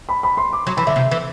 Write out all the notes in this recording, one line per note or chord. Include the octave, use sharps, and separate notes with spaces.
B5
B5
C6
D6
F#3 C6
E3 B5
D3 E5
C3
E3